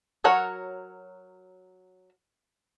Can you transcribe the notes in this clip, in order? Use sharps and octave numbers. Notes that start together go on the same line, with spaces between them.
F#3 F#4 A#4 C#5 F#5